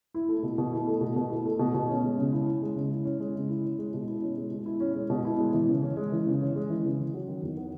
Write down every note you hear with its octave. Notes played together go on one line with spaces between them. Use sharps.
E4
A3
B2
B2
E4
A3
B2
B2
E4
A3
B2
B2
C#4
G#3
C#3
E4
C#4
G#3
C#3
E4
C#4
G#3
C#3
E4
C#4
G#3
B2
E4
C#4
G#3
B2
E4
C#4
G#3
B2
E4
G#3
E3
C#3
C#4
G#3
E3
C#3
C#4
G#3
E3
C#3
C#4
F#3
D#3
E2
B3